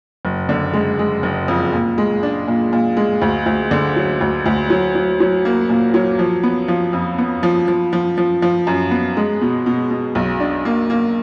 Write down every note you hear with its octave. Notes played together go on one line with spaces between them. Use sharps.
F#1
D3
G#3
G#3
F#1
F2
A#2
G#3
D4
A#2
A#2
G#3
D2
D2
D3
F#3
D2
D2
F#3
F#3
F#3
A#3
A#2
F#3
F3
B3
F3
F2
B3
F3
F3
F3
F3
F3
F#2
B3
G#3
B2
B2
B2
B1
D4
A#3
A#3